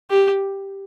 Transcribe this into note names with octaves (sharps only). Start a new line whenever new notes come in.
G4